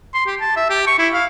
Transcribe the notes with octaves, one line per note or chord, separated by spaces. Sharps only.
C6
G4
A5
E5
G4
C#6
E4
F5